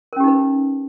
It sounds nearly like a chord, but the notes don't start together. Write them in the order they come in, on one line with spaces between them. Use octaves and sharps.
A#4 C#4 G4 D#4 B4